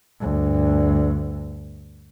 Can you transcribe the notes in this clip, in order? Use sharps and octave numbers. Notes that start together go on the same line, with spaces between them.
D2 G2